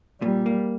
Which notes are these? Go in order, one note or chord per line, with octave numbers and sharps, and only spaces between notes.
A#2 G3
A#3